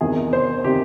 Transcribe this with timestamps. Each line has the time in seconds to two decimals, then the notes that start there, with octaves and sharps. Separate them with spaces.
0.01 E2 C3 D#3 G#4
0.33 C5
0.64 C3 D#3 G4